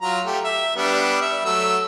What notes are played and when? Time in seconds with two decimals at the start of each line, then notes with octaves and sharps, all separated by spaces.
0.02 F#3 F4 A#5
0.25 A3 G4
0.44 E5
0.76 G3 B3 D4
1.22 E5
1.45 F#3 A3 E6